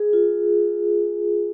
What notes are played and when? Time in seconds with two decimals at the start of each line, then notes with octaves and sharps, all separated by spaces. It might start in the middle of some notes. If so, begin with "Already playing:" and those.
Already playing: G#4
0.13 F4